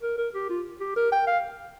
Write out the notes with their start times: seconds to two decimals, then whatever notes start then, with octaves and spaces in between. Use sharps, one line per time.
0.03 A#4
0.18 A#4
0.34 G4
0.49 F4
0.80 G4
0.96 A#4
1.12 G5
1.27 F5